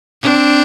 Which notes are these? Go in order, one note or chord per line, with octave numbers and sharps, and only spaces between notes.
C4 D4